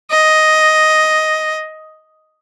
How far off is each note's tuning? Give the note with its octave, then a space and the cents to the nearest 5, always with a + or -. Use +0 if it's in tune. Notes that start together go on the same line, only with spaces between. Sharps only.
D#5 +5